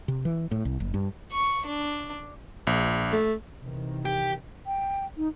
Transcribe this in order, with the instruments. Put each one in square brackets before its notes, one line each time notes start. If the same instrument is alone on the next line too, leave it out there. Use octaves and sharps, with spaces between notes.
[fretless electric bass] C3
E3
A2
C2
F#1
G2
[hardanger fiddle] C#6
D4
[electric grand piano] A#1
[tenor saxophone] A3
[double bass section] C3 D#3 E3
[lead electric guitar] G4
[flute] G5
D#4